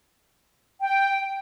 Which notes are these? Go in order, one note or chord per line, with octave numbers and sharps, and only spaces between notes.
G5